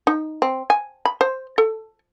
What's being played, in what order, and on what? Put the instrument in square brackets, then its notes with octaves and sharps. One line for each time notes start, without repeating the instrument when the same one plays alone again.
[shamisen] D#4
C4
G#5
B5
C5
A4